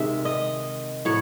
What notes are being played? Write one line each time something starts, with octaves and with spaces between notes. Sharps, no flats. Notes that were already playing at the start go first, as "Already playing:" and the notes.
Already playing: C3 D#3 G#3 E5
D#5
A2 F#3 C#5